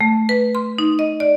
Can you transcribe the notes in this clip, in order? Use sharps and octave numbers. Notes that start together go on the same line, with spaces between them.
A3
B4
C6
D#4
D#5
D5